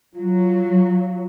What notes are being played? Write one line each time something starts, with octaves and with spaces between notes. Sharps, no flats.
F#3 F4